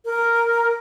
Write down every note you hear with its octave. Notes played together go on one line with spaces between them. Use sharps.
A#4